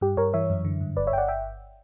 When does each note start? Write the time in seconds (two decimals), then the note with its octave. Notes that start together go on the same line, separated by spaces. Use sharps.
0.01 G2 G4
0.17 G2 A#4 C#5
0.33 E3 C#5 E5
0.50 F#2
0.65 D3
0.81 G2
0.97 G1 B4 D5
1.07 C#5 E5
1.12 G1 G5
1.18 D5 F#5
1.28 E5 G5